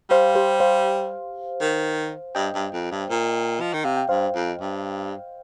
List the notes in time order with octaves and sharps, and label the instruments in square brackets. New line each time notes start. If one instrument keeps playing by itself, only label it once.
[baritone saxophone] G3 [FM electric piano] C5 F5
[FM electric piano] G4 C5
C5 F5
[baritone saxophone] D#3
[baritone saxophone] G2 [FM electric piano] D#5 G5
[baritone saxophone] G2
F2
G2
A#2
F3
D#3
[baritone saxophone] C3 [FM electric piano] F5
[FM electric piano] G5
[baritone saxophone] G2 [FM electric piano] C5 F5
[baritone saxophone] F2
G2